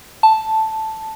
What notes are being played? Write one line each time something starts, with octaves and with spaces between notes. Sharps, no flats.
A5